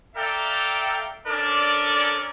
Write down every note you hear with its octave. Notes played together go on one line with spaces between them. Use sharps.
A4 D5 E5 F5 G5 A#5
C#4 D4 A4 A#4 D5